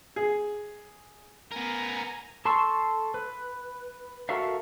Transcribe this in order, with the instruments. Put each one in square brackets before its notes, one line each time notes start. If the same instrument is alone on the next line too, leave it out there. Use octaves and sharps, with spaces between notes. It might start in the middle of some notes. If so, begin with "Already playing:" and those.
[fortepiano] G#4
[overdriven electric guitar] B3 A#4 [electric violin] G#5 A#5
[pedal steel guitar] A4 A5 C6 C#6 E6
B4
F#4 A4 A#4 E5 F5